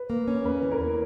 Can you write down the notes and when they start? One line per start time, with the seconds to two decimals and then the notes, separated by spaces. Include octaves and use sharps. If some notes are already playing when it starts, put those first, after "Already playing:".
Already playing: B4
0.10 A#3
0.28 C#4
0.44 E2 B4
0.62 E3
0.71 A#4
0.80 E2